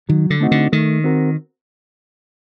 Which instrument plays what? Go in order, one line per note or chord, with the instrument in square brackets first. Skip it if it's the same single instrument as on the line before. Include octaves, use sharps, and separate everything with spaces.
[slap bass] D#3 [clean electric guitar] F#3
[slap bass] D3
[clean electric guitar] A3 C4 D#4 F#4
[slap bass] D3
[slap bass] D#3 [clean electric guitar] A3
[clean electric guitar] C4 F#4 A#4